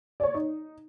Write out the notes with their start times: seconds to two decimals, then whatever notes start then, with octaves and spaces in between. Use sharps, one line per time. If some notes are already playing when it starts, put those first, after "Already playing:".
0.20 C#5 D5
0.34 D#4